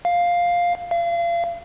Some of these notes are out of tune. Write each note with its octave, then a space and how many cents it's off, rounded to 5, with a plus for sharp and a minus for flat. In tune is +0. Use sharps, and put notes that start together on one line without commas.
F5 +5
F5 -35